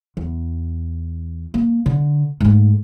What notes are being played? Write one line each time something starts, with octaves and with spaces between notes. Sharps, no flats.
E2
A#3
D3
G#2 A3